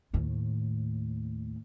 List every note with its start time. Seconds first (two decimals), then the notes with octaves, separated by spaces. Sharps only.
0.13 D#2 A2